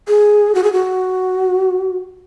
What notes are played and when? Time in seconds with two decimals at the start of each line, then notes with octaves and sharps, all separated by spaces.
0.08 G#4
0.55 F#4
0.64 G#4
0.72 F#4